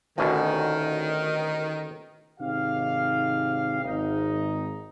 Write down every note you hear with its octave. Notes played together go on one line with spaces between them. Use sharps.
A1 D2 B2 D#3
G#1 C3 D#4 G4 F5
G#1 D#4